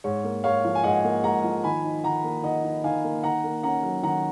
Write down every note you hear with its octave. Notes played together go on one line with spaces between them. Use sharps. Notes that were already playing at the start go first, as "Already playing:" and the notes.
G#2 C#5
A#3
G#2 C#5 F5
F3
G#5
G#2 D#5 F#5
A#3
G#2 F#5 A#5
F3
D#3 G#5 B5
D#4
D#3 F#5 A#5
A#3
D#3 D#5 F#5
D#4
D#3 F5 G#5
A#3
D#3 F#5 A#5
A#3
C#4 F#5 A#5
F#3
D#3 F#5 A#5